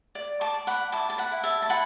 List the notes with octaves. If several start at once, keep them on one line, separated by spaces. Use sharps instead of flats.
D5
A5 D6
D5
F#5 B5
E4 A5 D6
A5
F#5 B5
E4
E5 A5
A5
E4 F#5 B5